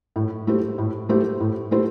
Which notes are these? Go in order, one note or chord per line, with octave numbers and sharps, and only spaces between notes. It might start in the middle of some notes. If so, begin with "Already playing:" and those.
A2
A3 E4 G4 C5
A2
A3 E4 G4 C5
A2
A3 E4 G4 C5